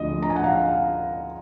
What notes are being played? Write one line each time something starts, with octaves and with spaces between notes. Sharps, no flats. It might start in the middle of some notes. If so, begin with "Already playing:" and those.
Already playing: D2 D3 F3 D#5
A#5
G#5
F#5
F5